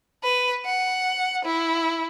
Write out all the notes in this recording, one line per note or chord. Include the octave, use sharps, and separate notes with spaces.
B4
F#5
E4